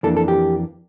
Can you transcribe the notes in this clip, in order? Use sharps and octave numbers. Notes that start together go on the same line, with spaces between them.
F2 E3 A#3 D4 A4
A4
G4